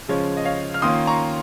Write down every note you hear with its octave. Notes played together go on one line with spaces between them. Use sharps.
C#3 F3 G#3 C#4 F4 C#5
D#5
C#5 F5
F6
D#3 A#3 C#4 F4 C6 D#6
A#5 C#6